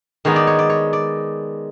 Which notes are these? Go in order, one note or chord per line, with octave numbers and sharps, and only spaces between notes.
D#3 G#3 B3 D#4 C#5
D5
C#5
D5
C#5
D5